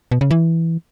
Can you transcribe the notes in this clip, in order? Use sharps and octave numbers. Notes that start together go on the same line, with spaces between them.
B2
C#3
E3